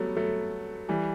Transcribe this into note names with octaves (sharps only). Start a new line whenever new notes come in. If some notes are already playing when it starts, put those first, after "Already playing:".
Already playing: F#3 G3 A3 B3
F#3 A3
E3 G3